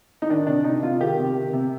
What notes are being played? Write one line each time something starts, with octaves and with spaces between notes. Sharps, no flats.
D#4
D#3 D4
C3 D4
C3 D#4
C3 F4
D#3 G4
C3
D#3
C3